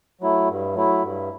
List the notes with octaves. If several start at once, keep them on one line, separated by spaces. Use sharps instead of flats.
F#3 A3 E4
G2
F#3 A3 E4
G2